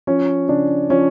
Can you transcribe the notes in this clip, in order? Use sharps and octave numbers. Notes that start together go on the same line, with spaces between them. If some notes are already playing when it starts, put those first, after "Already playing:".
F3 C#4
C#3 D4
F3 C#4